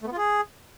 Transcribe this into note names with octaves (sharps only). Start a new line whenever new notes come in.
A3
B3
F4
G#4